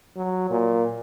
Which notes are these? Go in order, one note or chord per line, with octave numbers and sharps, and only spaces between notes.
F#3
A#2